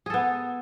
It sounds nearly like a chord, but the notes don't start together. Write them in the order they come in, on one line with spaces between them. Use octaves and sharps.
G#4 A4 B3